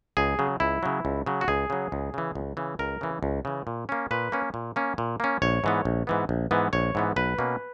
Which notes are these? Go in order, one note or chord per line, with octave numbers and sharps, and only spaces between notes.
C#2 G#4
C#3 F#3
C#2 E4
C#3 F#3
C#2
C#3 F#3
F#4
C#2 G#4
C#3 F#3
C#2
C#3 E3
C#2
C#3 E3
C#2 A#4
C#3 E3
C#2
C#3 E3
A#2
A#3 C#4
A#2 B4
A#3 C#4
A#2
A#3 C#4
A#2
A#3 C#4
A#1 C#5
G#2 E3 B3
A#1
G#2 E3 B3
A#1
G#2 E3 B3
A#1 C#5
G#2 E3 B3
B1 B4
B2 A#3 C#4